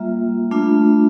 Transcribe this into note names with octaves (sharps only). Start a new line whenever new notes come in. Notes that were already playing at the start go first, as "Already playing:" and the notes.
Already playing: G3 A#3 F4 E5
A3 D4 F4